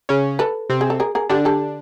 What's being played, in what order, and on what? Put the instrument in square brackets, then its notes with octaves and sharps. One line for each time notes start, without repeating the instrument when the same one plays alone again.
[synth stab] C#3 C#4
[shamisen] A4 B4
[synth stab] C3 C4
[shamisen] G#4
A4
G#4 A#4
G#4 A#4
[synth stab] D3 D4 [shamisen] G4 A4
[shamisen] G4 A4